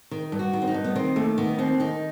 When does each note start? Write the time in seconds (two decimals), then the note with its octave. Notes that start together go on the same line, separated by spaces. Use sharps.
0.11 D#3
0.32 G2
0.39 F#4
0.53 D#3
0.62 C4
0.67 D#4
0.74 G2
0.84 B3
0.96 D#3 C4
1.16 D#2 A3
1.38 D#3 B3
1.58 D#2 C4
1.80 D#3 D#4